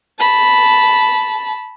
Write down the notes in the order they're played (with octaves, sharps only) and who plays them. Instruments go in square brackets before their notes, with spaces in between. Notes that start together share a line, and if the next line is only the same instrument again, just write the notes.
[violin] A5 B5